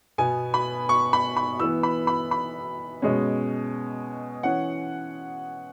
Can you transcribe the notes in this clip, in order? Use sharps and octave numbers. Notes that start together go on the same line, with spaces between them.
B2 B3 G#5
B5
C#6
B5
B5
E3 B3 E6
B5
B5
B5
B2 G#3 C#4
E3 C#4 F#5